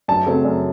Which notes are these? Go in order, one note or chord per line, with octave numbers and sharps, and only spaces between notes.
F#2 A5
C#3 F#3 A3 C4
F#2